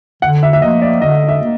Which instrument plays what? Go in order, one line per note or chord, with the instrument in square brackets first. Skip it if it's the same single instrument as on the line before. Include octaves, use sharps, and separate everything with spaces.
[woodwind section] D3 [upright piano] F#5
[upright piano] E5
E5
[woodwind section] F3 A#3 [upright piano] D#5
[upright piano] D5
[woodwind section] D3 [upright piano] D#5
[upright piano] E5
[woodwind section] A#3